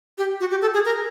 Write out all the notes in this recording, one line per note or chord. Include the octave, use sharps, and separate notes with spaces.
G4
F#4
G4
A4
G#4
A#4